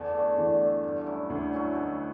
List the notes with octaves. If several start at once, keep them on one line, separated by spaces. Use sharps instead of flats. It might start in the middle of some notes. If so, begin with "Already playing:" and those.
Already playing: E2 D3 E3
A3 D4
E2 D3 E3
A3 D4
G2
F#3 C#4 E4
D2 G2 D3
F#3 C#4 E4
B2